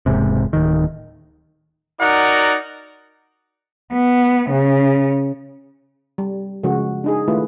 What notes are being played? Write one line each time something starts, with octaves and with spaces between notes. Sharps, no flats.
E1 G#2 C3
D1 D#3
D#4 F#4 A#4 D5 F#5
B3
C#3
G3
C#3 F3 G#3 C#4 F#4
D4 D#4 G#4
D#3 A3 E4 F4 B4